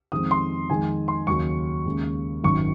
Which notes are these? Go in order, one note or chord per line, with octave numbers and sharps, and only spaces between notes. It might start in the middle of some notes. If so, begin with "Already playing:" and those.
F2 D#3 G#3 C4 D#6
C6
F2 D#3 G#3 G#5
C6
D#2 C#3 F#3 C#4 C#6
D#2 C#3 G#3
G#1 F#2 D#3 C#6